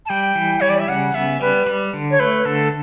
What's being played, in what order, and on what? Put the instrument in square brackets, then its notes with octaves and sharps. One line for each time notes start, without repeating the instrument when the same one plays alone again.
[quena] A5
[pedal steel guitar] G3 [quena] G5
[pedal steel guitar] E3
[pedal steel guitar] G3 [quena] C#5
[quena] D5
E5
[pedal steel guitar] C#3 [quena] F#5
[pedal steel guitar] B3 [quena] E5
[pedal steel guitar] G3 [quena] B4
[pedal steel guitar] G3
D3
[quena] C#5
[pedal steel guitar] A3 [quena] B4
[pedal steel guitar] D3 [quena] A4